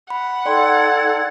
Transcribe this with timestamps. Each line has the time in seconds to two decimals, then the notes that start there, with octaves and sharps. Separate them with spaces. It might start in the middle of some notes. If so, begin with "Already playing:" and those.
0.10 F#5 B5
0.46 D#4 A4 D5 G5 C6 G#6